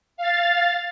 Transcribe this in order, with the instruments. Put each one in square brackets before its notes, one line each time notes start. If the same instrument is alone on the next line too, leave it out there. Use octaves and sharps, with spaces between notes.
[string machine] F5 A6